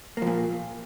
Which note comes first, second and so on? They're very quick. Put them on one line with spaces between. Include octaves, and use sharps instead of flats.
A#3 F3 A#2